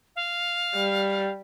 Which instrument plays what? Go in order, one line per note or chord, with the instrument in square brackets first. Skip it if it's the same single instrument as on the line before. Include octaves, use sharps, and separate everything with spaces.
[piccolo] F5
[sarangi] G3